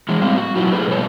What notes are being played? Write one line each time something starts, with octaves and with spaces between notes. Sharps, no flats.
E3 G#3
A2 G3 C4 F5
F#4
G2 B2 F#3 E4 F4
A3 A#3 G4 G#4 B4
B2 F3 G3 C#5